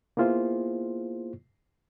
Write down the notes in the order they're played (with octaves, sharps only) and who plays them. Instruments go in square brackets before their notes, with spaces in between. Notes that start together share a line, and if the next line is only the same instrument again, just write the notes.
[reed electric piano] A#3 B3 E4 F4 G#4 C5